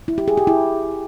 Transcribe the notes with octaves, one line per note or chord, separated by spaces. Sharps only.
E4
G4
G#4
G4
E4